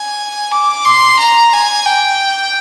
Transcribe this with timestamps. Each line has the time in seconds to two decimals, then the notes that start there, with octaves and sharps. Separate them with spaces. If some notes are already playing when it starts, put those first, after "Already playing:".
Already playing: G#5
0.51 D6
0.85 C6
1.19 A#5
1.53 G#5
1.86 G5